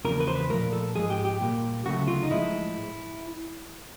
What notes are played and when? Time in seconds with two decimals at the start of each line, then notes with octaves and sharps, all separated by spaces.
0.05 E2 C#3 F3 A#3 A#4
0.20 B4
0.28 C5
0.35 B4
0.50 A#2 F3 A3 A#4
0.73 A4
0.95 G#2 F3 G#3 G#4
1.10 G4
1.25 G4
1.41 A#2 G3 A#3
1.85 D2 C#3 F#3 A3 F#4
2.07 F4
2.22 D#4
2.31 A2 F3 G#3 E4